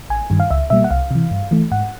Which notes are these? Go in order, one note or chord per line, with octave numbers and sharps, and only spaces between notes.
A1 G#5
G2 D#3 G3
F5
C#2 E5
B2 G3 A#3 E5
F#5
C2 F5
C3 E3
G2
E3 A3
G#2 F#5